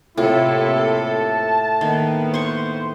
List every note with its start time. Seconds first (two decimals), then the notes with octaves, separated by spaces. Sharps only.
0.17 A2 C3 A#3 E4 F4 A4
0.87 A5
1.81 D#3 A#3 B3
2.34 C5 C6 C#6